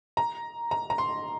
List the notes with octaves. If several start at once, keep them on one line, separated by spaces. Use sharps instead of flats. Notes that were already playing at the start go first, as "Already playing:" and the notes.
A#5
A#5
A#5
C6